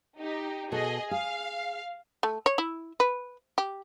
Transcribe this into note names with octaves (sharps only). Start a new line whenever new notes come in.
D#4 G4
B2 F#4 G#4 A4 D#5
G#4 F5
A3
C#5
E4
B4
G4